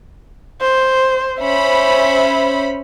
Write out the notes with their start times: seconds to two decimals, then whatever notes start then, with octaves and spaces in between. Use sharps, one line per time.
0.61 C5
1.41 C#4 C5 E5 B5